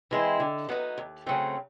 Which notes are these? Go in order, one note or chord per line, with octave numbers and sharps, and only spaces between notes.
E3 G#3 C4 E4
D3
F#3 B3 D#4
D#2
C#3 F#3 A3 C4